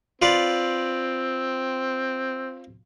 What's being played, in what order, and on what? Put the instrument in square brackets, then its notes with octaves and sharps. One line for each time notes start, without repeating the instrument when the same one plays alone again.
[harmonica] C4 [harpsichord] F4 B4 D5